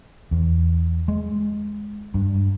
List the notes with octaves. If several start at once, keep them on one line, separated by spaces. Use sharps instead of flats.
E2
G#3
G2